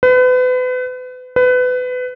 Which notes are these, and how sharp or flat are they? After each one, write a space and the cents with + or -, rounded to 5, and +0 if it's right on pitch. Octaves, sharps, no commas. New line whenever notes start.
B4 +35
B4 +25